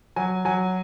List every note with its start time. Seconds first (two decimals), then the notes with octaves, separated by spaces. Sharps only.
0.16 F#3 G#5
0.45 F#3 G#5